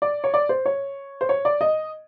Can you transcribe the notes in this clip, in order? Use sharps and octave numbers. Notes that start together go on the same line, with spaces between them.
D5
C#5
D5
C5
C#5
C5
C#5
D5
D#5